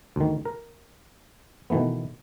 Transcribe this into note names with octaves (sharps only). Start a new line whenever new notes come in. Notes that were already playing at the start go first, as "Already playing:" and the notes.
D2 D#3
A#4
B2 D#3 E3 A3 B3